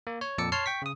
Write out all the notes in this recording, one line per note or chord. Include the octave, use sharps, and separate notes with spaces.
A#3
C#5
F2 A#2 A5 D6 E6 C#7
C#5 A5 C6 F6 C7
G5 C#6 B6
C#3 D#6